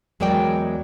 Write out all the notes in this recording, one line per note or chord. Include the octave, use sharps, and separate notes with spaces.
E2 F#3 G#3 A#4 D5 G5